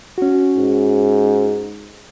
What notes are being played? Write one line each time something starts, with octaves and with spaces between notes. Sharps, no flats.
C#4 F#4
G#2